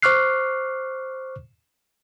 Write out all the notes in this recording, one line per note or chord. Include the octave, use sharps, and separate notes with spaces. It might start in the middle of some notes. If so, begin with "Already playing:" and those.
C5 C#6 D6 F6 F#6 C7